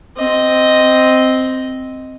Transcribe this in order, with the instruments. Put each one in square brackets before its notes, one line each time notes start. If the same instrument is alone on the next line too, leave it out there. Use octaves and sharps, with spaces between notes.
[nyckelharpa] C4 D#5